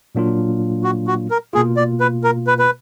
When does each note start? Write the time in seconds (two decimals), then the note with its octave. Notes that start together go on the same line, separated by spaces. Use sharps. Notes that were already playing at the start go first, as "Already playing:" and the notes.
0.15 A#2 F#3 A#3 D4 F4
0.84 F#4
1.07 F#4
1.31 A#4
1.53 B2 A#3 F4 G#4
1.77 D5
2.00 B4
2.24 A#4
2.47 B4
2.59 B4